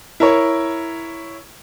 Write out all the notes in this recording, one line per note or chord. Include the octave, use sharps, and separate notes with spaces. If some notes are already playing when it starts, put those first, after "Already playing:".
E4 A#4 C#5